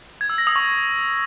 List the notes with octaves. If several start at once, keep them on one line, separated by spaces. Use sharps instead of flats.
G#6
E6
A#6
D#6
C#6